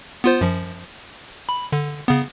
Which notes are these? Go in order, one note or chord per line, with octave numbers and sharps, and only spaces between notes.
B3 F4 C5
F#2 F3
B5
D3
C#3 B3